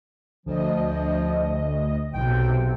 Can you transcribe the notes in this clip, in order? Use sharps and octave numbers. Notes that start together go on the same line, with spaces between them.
D2 F3 D#5
B1 C3 G5